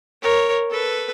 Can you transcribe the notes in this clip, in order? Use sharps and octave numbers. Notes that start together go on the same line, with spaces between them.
A#4 C#5
A4 B4